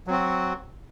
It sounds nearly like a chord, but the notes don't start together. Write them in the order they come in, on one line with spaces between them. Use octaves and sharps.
F#3 C4 F#4